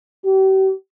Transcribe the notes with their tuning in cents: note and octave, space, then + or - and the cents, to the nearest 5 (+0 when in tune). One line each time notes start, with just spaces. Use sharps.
G4 -40